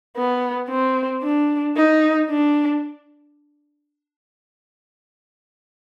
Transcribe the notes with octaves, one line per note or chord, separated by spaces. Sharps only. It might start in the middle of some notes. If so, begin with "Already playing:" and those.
B3
C4
D4
D#4
D4